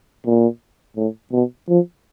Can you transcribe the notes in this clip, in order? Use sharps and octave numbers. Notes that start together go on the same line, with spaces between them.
A#2
A2
B2
F3